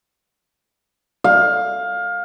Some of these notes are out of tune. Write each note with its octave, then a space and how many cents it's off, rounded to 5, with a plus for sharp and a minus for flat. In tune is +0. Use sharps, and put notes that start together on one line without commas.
F5 +20